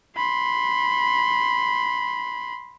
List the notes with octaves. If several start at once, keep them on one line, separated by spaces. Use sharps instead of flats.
B5 C6